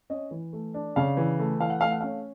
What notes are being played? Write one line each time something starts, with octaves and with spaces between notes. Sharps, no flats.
C#4 D#5
E3
A3
D4
C#3 F5
E3
A3
E3 F5
F#5
A3 F5
F#5
C#4 F5